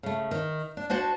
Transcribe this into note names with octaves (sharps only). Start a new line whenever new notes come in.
C#3 A3
D#3
D4
D4 F#4 C5 F#5 A5